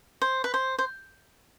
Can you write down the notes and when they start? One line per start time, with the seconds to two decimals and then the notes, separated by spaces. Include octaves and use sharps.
0.22 C5
0.44 B4
0.54 C5
0.78 C5